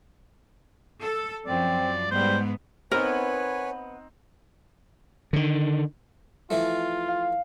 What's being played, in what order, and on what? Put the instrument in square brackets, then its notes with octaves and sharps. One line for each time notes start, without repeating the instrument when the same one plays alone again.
[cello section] A4
[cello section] F#2 F3 [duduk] C4 [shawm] D5
[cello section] G#2 B3 [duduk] G3 [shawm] C5
[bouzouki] B3 [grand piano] C4 D#4 [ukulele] A#4 [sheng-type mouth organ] B4 C#5 G#5
[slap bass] D3 D#3
[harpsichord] E3 F3 A3 [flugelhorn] F4
[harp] F5